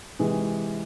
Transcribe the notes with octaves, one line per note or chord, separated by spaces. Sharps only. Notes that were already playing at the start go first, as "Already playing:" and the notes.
C3 E3 G#3